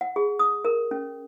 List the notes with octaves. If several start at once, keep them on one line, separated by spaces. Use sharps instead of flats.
F#5
G#4
D#6
A#4
C#4